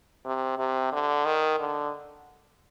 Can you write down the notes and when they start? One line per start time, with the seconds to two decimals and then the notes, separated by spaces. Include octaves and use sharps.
0.25 C3
0.58 C3
0.92 D3
1.25 D#3
1.60 D3